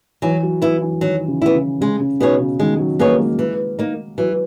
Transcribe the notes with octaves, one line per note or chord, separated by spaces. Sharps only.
E3 F#3
F#3
E3 B3 E4
E3
D#3 F#3
C#3
B3 E4
C#3
C#3 G#3
C#3
B2 B3 D#4 G#4 C#5
C#3
D#3 G#3
F#3
A#3 B3 D#4 G#4 C#5
G#3
E3
A#3 D#4
E3 F#3
F#3